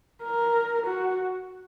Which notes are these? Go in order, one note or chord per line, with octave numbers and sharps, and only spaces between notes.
A#4
F#4